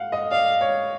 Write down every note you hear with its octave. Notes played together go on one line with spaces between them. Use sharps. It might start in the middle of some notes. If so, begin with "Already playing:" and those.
Already playing: F5 F#5
D#5
D5 F5
C#5